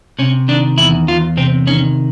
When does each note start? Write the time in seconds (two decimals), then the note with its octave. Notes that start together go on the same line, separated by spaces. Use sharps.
0.19 C3 C#4
0.48 D#3 D4
0.78 E2 E4
1.08 E2 F4
1.37 C3 C4
1.67 D#3 C#4